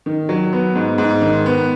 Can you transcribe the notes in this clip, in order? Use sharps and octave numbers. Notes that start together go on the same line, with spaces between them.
D#3
F#3
B3
G#2
G#2
D#3
B3